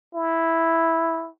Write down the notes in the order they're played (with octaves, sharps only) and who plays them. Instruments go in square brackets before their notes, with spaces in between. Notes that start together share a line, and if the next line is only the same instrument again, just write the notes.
[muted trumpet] E4